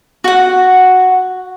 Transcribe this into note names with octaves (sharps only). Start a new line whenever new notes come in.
F#4 F#5